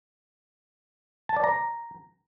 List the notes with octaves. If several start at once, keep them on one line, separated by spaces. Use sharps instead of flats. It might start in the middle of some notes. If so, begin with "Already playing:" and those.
A5
D5
A#5